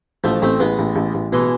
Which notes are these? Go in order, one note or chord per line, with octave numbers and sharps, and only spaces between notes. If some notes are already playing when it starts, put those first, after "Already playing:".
A1 F3 A3
A1 A3 C4
A1 G#3 B3
A1
A1
A1
B2 E3 G#3